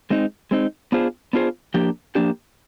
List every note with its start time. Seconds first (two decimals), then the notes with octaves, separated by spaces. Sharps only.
0.10 G#3 C4 D#4
0.51 G#3 C4 D#4
0.92 B3 D4 F4 G#4 C5
1.33 B3 D4 F4 G#4 C5
1.74 F3 A#3 D4 G4
2.15 F3 A#3 D4 G4